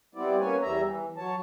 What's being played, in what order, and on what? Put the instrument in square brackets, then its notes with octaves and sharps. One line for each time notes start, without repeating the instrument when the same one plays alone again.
[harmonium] G3 B3 C4 E4 D5
A#3 C#4 B4 C#5 G#5
E2 G3 E5 A#5
E3
F#3 C#5 A5